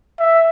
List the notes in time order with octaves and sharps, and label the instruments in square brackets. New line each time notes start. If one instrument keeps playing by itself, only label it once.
[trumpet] E5